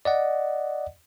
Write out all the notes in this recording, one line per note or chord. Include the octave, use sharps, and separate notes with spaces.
D5 D#5 F#5